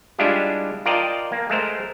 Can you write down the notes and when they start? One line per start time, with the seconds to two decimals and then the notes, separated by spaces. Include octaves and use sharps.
0.19 G3 G#3 D4 E4 F4 G4
0.85 F4 A#4 D5 D#5 G5 A5
1.32 A#3
1.50 G#3 A3 A#4 C5